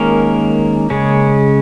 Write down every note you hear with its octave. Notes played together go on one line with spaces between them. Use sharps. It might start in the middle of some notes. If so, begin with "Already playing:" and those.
Already playing: D#3 G#3 A#3 C#4 A#4
C#3 G#3 C#4